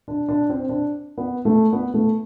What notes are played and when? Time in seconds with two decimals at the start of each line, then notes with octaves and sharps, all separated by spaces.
0.08 D4
0.28 D4
0.49 C4
0.69 D4
1.18 B3
1.45 A3
1.73 B3
1.94 A3